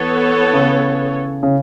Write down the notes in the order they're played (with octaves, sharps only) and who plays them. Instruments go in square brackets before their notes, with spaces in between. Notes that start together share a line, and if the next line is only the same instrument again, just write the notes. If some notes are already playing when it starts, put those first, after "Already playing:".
Already playing: [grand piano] E3 [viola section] B3 A4 C#5
[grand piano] C#3
C#3